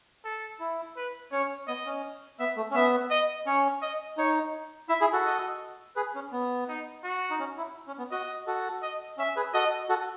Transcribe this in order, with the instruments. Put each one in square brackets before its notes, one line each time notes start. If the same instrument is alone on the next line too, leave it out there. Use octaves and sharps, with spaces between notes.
[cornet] A4
[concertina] E4
[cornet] B4
[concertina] C#4 [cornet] C#5
[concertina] B3 [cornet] D#5
[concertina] C#4
[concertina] B3 [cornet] E5
[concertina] A3
C#4
[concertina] B3 [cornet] E5
[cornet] D#5
[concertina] C#4 [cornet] C#5
[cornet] D#5
[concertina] D#4 [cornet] C#5
[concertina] E4 [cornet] E5
[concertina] E4 G#4
F#4 A4
[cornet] D#5
[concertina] G#4 B4
C#4
B3
[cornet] D#4
F#4
[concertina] D#4
C#4
E4
C#4
B3
[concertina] F#4 [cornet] D#5
[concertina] F#4 A4
[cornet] D#5
[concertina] C#4 [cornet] E5
[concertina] G#4 B4
[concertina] F#4 A4 [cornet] D#5
[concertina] F#4 A4